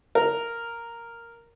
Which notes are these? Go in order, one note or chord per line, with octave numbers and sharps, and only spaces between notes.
A#4